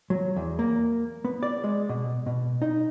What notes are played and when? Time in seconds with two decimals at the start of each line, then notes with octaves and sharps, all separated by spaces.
0.10 F#3
0.36 E2
0.59 A#3
1.25 B3
1.43 D5
1.64 G#3
1.89 B2
2.26 B2
2.62 D#4